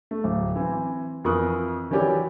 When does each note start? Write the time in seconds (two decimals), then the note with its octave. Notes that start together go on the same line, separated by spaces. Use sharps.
0.11 A3
0.24 D1
0.56 E3 C4
1.25 F2 E3 A#4 C#6 D#6 F#6
1.91 D#3 E3 F#3 C#4 G4 D5